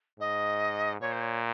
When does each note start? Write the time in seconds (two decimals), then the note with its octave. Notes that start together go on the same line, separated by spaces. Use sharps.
0.20 G#2 D#5
1.01 A#2 C#5
1.12 C5
1.21 C#5